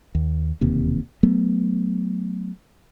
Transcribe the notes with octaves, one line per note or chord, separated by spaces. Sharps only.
D#2
E1 D#2 C3 A#3
F#3 A3 B3